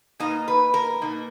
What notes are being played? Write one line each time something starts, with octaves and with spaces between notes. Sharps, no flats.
B2 A#3 D#4 D#5
B4
A#4
B2 A#3 D#4